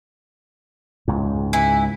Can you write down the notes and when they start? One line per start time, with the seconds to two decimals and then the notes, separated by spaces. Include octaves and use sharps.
1.08 C#2 G#2
1.53 E3 E4